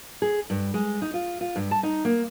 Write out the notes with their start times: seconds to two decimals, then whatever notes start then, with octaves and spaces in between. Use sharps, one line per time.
0.22 G#4
0.50 G2
0.74 G#3
1.02 D#4
1.14 F4
1.41 F4
1.56 G2
1.71 A5
1.83 D#4
2.05 A#3